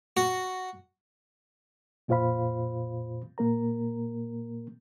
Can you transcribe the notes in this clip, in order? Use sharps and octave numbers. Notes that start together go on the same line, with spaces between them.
F#4
F2 A#2 F4 C5 F5 B5
A#2 A#3 A#4 A#5